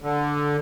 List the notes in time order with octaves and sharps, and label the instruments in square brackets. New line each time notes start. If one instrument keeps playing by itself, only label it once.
[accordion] D3